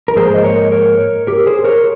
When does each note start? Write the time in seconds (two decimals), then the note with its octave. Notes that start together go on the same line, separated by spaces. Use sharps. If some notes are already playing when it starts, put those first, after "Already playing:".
0.08 A#4
0.15 G#2 F3 A#3 G#4 C5
0.34 D#5
0.44 A#4 C#5
0.72 A#4 C#5
1.27 G4 A#4
1.46 G#4 C5
1.64 A#4 C#5